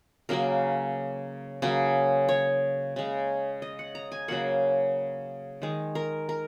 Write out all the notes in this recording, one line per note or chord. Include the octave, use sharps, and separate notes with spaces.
C#3 F#3 A#3 A#4
C#3 F#3 A#3
C#5
C#3 G#3
D#5
F#5
A#5
G#5
C#3 F#3 A#3 F#5
D#3 G#3
A#4
A#4